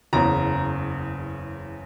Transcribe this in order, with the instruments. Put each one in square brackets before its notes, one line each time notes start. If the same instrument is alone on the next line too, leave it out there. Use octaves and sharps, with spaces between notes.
[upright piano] F#1 E2 C#3 A#5